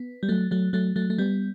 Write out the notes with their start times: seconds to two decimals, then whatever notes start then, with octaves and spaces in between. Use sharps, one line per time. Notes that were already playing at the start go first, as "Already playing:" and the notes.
Already playing: B3
0.23 G3
0.29 F#3 A3
0.51 F#3 A3
0.73 F#3 A3
0.96 F#3 A3
1.10 A3
1.18 G3 B3